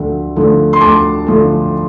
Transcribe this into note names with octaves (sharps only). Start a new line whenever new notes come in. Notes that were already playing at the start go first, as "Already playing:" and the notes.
Already playing: D2 D3 F3 A3
D3 F3 A3
C6
D2 A5 D6
D3 F3 A3